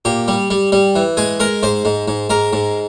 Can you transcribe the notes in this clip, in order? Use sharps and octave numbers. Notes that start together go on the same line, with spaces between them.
A#2 G4
G3
G3
G3
E3
G#3 G#4
G#3 A#4
G#2 C5
G#2
G#2
G#2 A#4
G#2